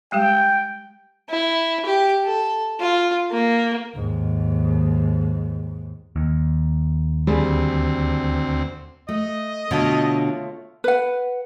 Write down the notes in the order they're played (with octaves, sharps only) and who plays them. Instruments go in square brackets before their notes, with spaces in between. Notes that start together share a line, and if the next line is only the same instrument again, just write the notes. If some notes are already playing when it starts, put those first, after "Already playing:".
[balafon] G3 G#3 G4 [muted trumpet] G5
[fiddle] E4
G4
A4
F4
A#3
[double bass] D#2 G#2
[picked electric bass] D#2
[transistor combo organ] D2 C4 [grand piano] G3 G#4
[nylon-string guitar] A3 [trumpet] D#5
[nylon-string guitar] B2 D3 [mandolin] A3 F4 C#5
[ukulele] B4 F#5